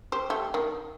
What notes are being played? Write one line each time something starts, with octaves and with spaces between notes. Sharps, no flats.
G4 C5
A3 G4
D#3